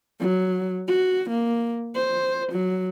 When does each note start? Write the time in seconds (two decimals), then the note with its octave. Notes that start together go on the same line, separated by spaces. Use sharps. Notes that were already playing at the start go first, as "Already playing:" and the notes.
0.20 F#3
0.88 F#4
1.30 A#3
1.95 C5
2.52 F#3